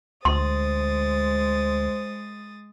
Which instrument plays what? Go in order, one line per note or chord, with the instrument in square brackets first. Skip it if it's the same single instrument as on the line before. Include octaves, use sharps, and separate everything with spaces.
[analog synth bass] D2 [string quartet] G#3 D#6 A6 [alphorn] C5 [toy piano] C6